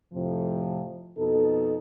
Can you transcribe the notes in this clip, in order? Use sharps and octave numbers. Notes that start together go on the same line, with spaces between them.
F2 A2 C3 F3
F2 B2 D#4 A4